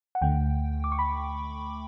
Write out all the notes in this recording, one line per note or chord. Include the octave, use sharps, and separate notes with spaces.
F#5
D2 D3 A3 G5
D6
C#6
B5